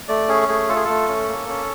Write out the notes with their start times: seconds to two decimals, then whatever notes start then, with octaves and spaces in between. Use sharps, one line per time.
0.08 A3 D5
0.28 C#4 G#4
0.48 A3 G#4
0.69 F4 A4
0.76 G#4
0.85 A3 A4
1.08 C#4
1.28 A#3
1.49 C#4